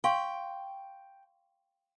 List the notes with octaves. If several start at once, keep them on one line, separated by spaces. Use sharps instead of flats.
F5 G5 C6 C#6